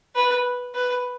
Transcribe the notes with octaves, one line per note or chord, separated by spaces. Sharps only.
B4
B4